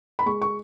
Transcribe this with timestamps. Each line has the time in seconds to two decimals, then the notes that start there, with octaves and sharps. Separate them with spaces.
0.19 B5
0.26 G#3 C#6
0.42 C#6